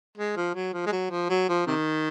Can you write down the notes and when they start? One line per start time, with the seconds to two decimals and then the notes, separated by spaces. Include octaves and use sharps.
0.17 G#3
0.36 F3
0.55 F#3
0.73 F3
0.86 G#3
0.92 F#3
1.11 F3
1.30 F#3
1.49 F3
1.67 C3 D#3